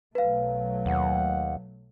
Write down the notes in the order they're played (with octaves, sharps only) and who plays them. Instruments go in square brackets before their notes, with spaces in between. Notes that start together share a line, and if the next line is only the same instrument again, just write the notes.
[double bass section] B1 F#3 A3 [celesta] B4 F5
[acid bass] D#2 [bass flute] F#5